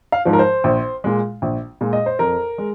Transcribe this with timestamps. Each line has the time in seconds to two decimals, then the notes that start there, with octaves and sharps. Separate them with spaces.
0.12 F5
0.25 G#2 F3
0.33 A#4
0.39 C5
0.64 A#1
1.04 A#2 G#3
1.42 A#1
1.81 A#2 G#3
1.93 D#5
2.06 C5
2.19 F2 A#4
2.58 G#3